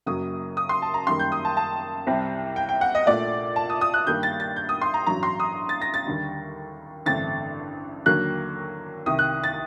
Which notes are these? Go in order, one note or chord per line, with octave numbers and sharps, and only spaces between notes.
F#1 F#2 F#3 A#3 D#6
D#6
C6
A5
A#5
F#2 D#3 G3 A#3 C6
G6
D#6
A5
A5
C2 C3 G3 C4
G5
G5
F#5
D#5
A#1 A#2 A3 D5
A5
D#6
D#6
F#6
G2 D#3 G3 A#3 G6
A6
A6
G6
D#6
C6
A#5
A1 G2 F#3 A#5
C6
D#6
A6
A#6
A6
D#2 D3 G3
A1 G2 D3 A3 C4 A6
D#2 D3 F#3 A#3 F#6
C2 C3 D#3 D#6
F#6
A6